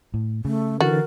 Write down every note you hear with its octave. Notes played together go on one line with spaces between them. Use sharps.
A2
C#3 A3
D3 E3 F#4 A#4 A6